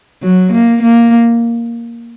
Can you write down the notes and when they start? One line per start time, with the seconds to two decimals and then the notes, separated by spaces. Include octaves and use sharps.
0.23 F#3
0.52 A#3
0.82 A#3